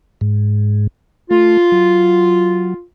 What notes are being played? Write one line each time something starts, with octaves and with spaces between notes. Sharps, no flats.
G#2
A3 F4
F#3